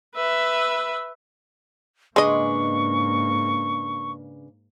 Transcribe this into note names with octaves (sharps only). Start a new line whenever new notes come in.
B4 E5
G#2 C#3 G#3 A#3 D4 B4 D#5 C#6